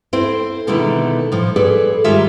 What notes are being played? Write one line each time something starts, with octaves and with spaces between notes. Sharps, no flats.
C4 E4 A4 C5
B2 D3 D#3 G#3 A3 E4
A2 F3
G#4 A4 B4 C#5 D5
G#2 D#3 G3 G#3 F4 E5